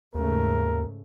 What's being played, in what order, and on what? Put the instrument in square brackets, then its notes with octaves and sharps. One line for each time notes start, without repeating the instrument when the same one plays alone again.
[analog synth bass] D#2 [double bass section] G#2 C#3 A3 [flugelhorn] A#4